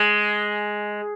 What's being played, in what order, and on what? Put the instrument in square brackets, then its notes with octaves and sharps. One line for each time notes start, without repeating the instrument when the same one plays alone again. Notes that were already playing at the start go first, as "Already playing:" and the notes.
Already playing: [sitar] G#3